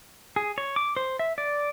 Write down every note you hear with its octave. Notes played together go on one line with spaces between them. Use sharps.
G#4
C#5
D6
C5
E5
D5